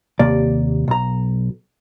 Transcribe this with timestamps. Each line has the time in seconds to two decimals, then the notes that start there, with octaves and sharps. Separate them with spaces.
0.19 D#2 C3 A#3 D5
0.88 B1 A#5